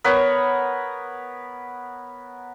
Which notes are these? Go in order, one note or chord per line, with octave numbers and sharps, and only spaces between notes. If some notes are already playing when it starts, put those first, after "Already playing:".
B3 A#4 B4 C#5